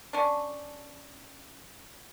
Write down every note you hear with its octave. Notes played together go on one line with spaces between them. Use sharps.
C#4 D4